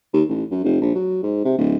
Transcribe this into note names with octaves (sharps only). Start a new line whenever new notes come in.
D#2
A1
F#2
F1
A#1
F#3
G#2
C3
D1